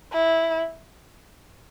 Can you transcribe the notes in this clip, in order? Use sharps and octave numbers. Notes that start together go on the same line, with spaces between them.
E4